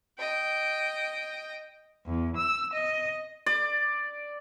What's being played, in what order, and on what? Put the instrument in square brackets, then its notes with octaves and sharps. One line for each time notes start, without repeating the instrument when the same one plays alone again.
[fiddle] D#5 G5
[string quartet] E2
E6
D#5
[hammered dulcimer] D5